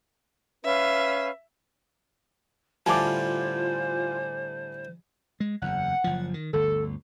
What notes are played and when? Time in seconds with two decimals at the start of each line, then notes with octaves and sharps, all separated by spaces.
0.65 C#4 B4 E5 F5
2.86 A2 D3 G3 F4 C5 G#5 A5 D6
5.40 G#3
5.62 F#1 E2 F#5
6.04 F#1 F3
6.34 D#3
6.53 G1 D2 A4